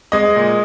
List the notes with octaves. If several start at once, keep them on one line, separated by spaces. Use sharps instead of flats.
G#3 D#5
A#2